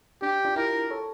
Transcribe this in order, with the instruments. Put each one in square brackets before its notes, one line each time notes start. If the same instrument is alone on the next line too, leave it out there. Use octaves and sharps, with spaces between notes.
[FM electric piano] D4 [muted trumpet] G4
[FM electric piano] D4 F4
[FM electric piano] E4 G4 [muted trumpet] A#4
[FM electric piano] A4 C#5